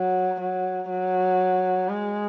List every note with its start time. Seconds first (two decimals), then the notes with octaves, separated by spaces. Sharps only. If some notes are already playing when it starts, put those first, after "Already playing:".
Already playing: F#3
0.40 F#3
0.90 F#3
1.89 G#3